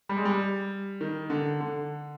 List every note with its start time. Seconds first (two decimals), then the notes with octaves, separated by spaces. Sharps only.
0.09 G3
0.17 G#3
0.25 G3
1.01 D#3
1.30 D3
1.61 D3